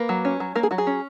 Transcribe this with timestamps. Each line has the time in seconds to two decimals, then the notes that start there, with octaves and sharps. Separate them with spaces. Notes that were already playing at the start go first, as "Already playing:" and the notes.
Already playing: A#3 B4
0.09 F#3
0.25 C#4
0.40 F#3
0.55 A#3 A#4
0.63 G#4
0.71 F#3 F#4
0.78 G#4
0.87 C#4